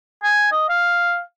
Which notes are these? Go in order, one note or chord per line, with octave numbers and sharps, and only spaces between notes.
G#5
D#5
F5